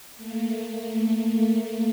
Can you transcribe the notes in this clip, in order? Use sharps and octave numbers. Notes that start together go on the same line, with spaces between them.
A3 A#3